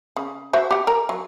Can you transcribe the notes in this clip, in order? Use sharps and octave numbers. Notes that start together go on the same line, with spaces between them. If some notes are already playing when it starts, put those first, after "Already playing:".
C#3
F#4 C5 E5
G4 F#5
A#4 A#5
F#3